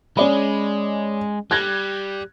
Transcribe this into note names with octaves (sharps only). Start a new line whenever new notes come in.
G#3 C#4 D5 B5
G3 F#6 G#6 A#6